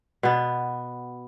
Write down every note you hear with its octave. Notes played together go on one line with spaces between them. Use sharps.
B2 B3